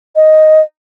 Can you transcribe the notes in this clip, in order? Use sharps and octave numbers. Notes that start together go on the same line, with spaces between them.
D#5